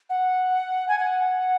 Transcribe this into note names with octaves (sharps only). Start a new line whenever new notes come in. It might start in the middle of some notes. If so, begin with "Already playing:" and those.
F#5
G#5
F#5